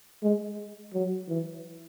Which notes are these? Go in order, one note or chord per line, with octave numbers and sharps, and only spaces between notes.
G#3
F#3
E3